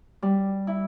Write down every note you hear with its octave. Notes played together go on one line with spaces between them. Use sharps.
G3
E4